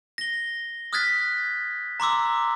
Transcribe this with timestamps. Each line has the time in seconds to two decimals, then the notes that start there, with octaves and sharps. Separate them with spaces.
0.18 A#6 G7
0.93 D#6 F6 F#6 G#6 A6 B6
2.00 A#5 C6 D6 E6